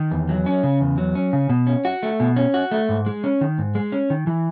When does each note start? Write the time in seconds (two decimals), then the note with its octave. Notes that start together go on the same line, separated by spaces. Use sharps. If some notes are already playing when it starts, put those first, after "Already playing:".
Already playing: D#3
0.11 E2
0.29 F#3
0.46 C#4
0.63 C#3
0.81 E2
0.98 F#3
1.15 C#4
1.33 C#3
1.49 B2
1.67 C#4
1.85 F#4
2.03 A3
2.20 B2
2.36 C#4
2.54 F#4
2.71 A3
2.89 G#2
3.06 G#3
3.24 C#4
3.41 D#3
3.58 G#2
3.75 G#3
3.92 C#4
4.10 D#3
4.27 E3